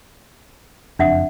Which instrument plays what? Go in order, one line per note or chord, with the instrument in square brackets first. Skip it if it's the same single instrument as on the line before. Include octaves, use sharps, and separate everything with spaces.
[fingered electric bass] F#1 F2 [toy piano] D4 E5 F#5